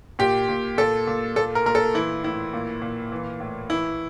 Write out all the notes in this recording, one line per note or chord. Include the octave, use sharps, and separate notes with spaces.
A#2 G4
A#2
A#2 A4
A#2
A#2 A4
A#4
A#2 A#4
A4
E3 E4
A2 E4
A#2
A#2
E3
A2
E3 E4